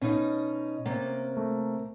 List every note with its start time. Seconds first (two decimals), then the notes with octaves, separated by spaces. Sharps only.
0.01 B2 C#4 D#4 D#5
0.85 C3 A#3
1.37 A3